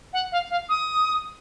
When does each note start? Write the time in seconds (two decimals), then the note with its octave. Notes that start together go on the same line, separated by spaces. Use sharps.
0.13 F#5
0.32 F5
0.50 F5
0.69 D#6